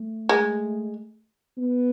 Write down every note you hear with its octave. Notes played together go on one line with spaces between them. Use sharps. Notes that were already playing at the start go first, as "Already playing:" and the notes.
Already playing: A3
G#3
B3